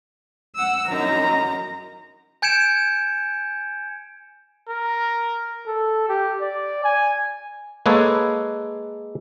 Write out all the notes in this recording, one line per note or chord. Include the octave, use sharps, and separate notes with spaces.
F#5 E6
F#2 D#4 A#5
G#5 G6 G#6 C#7 D7 E7
A#4
A4
G4
D5
G#5
G#3 A#3 G#4 A4 B4 C#5